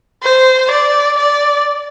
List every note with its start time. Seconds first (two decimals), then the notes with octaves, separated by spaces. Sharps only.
0.23 C5
0.71 D5
1.18 D5